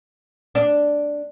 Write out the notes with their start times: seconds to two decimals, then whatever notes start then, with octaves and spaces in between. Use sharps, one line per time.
0.55 D4